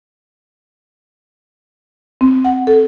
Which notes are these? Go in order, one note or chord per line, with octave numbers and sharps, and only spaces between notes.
C4
F#5
A4